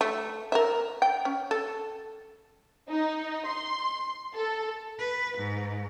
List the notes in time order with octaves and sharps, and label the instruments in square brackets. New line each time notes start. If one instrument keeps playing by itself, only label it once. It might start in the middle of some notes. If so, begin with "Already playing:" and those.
[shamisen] A3
A#4 C5 E5
G5
C#4
A4
[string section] D#4
C6
A4
[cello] B4
G#2